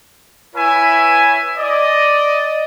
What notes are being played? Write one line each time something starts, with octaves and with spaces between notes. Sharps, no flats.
E4 B4 C#5 E5 G#5
D5 D#5